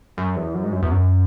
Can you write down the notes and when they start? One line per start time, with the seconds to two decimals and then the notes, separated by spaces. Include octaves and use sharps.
0.18 F#2
0.36 E2
0.54 F#2
0.64 G#2
0.73 F#2
0.83 E2
0.91 F#2